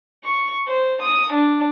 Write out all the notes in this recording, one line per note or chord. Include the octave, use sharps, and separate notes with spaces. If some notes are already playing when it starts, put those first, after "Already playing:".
C#6
C5
D#6
D4